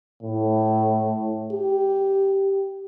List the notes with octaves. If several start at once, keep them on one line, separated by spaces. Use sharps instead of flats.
A2
G4